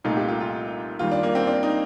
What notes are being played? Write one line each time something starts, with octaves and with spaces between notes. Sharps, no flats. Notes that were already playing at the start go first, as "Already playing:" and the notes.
C2 A#2 A3 D#4 F4
G4
F4
F4
D#2 D#3 G3 F4
D4
A#3
C4
D4
D#4